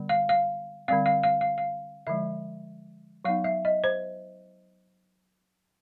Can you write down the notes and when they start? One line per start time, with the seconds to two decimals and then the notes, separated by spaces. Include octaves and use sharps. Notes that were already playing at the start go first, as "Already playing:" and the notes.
Already playing: D3 G3 B3
0.09 F5
0.29 F5
0.88 D3 G3 C4 F5
1.06 F5
1.23 F5
1.41 F5
1.58 F5
2.07 D3 F3 G#3 E5
3.25 F#3 B3 D#4 F5
3.44 E5
3.65 D#5
3.84 C5